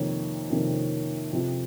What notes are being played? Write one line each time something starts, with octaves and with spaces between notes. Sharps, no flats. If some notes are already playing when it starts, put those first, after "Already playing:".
Already playing: F2 C3 D#3 A#3 C#5
F2 C3 D#3 A#3
F2 C3 F3